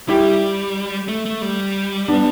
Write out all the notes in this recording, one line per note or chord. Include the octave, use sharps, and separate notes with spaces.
G3 E4 G4
A3
A3
G3
B3 D4